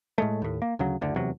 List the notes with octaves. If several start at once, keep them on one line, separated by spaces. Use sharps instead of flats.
A2 G#3 A3
D#2 A2
A#3
D2 C#3 F#3
F#1 D2 D3
F1 E2 C3 F#3